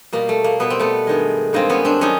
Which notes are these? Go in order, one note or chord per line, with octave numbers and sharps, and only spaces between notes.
B2 G3 A#3
A3
A#3
B2 G3 B3
C4
A3 B3
G2 D#3 G#3
G2 D#3 G#3 A#3 C4
B3 C#4
C4 D4
D#3 F#3 C#4 D#4